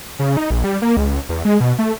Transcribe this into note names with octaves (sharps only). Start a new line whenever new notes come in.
C#3
D#4
A#1
G3
A#3
C#2
E2
G#3
B2
A3